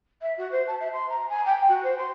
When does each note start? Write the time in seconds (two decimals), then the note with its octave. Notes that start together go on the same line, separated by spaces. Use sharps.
0.22 E5
0.38 F#4
0.52 C5
0.68 A5
0.80 E5
0.93 C6
1.09 A#5
1.29 G#5
1.46 G5
1.69 F#4
1.84 C5
1.98 C6